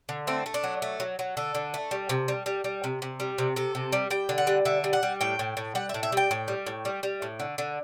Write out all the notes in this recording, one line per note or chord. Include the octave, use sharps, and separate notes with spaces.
D3
A3 C4
A3
D4
F#3
A3
F#3
F#3
D3 A4
D3
A3
G3
C3
G3
G3
G3
C3
C3
G3
C3
C3 A4
C3
G3
G3 G5
D3
F#5
G3
D3 E5
G3
F#5
G3
A2 G5
A2
A2
G3 F#5
E5
A2
E5
G3 G5
A2
G3
A2
G3
G3
A2
D3
D3